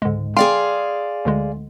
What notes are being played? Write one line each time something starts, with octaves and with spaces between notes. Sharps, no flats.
C#2 G#2 D3 G#3
G#4 D5 F5 G5 C6
D2 D3 G#3